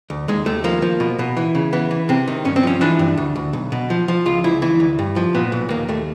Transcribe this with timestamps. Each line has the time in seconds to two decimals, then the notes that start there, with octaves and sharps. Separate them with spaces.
0.10 D2
0.28 D#2 G#3
0.46 D#2 A3
0.64 F3 A#3
0.82 F3
1.00 B2
1.19 B2
1.37 E3
1.55 C#3
1.73 E3 B3
1.91 E3
2.09 C3 C4
2.28 D#3
2.45 G2 C#4
2.56 C4
2.63 F3 C#4
2.81 E3 D4
2.99 G2
3.17 D2
3.36 D2
3.53 B1
3.72 B2
3.90 F3
4.08 F3
4.26 C#2 F4
4.44 C#2 E4
4.62 E3 E4
4.80 D2
4.99 G2
5.16 F3
5.35 A#2 B3
5.52 B1
5.70 D#2 A#3
5.88 D#2 A3